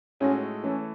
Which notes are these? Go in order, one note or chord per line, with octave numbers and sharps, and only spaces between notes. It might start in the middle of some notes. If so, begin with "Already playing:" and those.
A2 G#3 C#4 D#4 F#4 A4
E3 A3 C#4 E4 A4